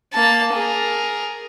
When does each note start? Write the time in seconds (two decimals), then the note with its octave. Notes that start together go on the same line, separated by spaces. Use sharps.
0.13 A#3 A5
0.53 G#4 A#4